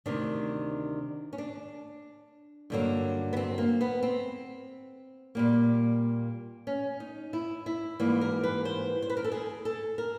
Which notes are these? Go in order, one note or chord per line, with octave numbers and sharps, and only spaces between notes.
D2 C3 D#3 D4
C#4
D4
G2 D3 F#3 A#3
B3
C4
A#3
B3
C4
A#2 G3 A#3
C#4
D#4
E4
E4
G#2 E3 G3 A#3 F4
A#4
B4
C5
C5
B4
A#4
A4
G#4
A4
A#4